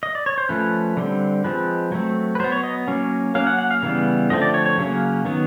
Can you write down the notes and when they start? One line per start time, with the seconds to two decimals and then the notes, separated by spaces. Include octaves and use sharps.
0.03 D#5
0.15 D5
0.26 C#5
0.38 C5
0.49 F3 A3 C#4 B4
0.97 D3 G3 C4
1.44 F3 G#3 C4 B4
1.92 F#3 A3 C4
2.35 B4
2.40 F#3 B3 C5
2.52 C#5
2.63 D#5
2.88 F#3 A#3 C#4
3.35 F#3 A#3 C#4 F5
3.47 F#5
3.59 F#5
3.71 F5
3.83 C#3 E3 G3 B3
4.30 D3 F3 A3 C4 D#5
4.42 D5
4.54 C#5
4.66 C#5
4.78 C#3 F#3 A#3 C#4
5.25 D#3 F#3 B3